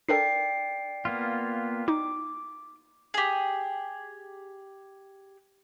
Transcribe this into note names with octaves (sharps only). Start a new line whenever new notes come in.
D4 A4 A#4 D5 G5 C7
A#3 B3 F4
D#4 D6
G4 G#4